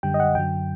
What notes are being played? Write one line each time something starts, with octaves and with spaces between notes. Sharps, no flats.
F#2 D3 G3 G5
D#5
F#5
F#2 D3 F#3 G5